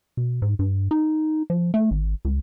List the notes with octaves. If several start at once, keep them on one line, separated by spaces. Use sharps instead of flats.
B2
G#2
G2
D#4
F3
A3
G#1
C#2